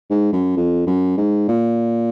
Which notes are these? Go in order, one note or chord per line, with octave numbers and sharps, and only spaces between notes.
G#2
F#2
F2
F#2
G#2
A#2